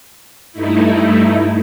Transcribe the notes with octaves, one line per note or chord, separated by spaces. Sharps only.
G2 A3 D#4 E4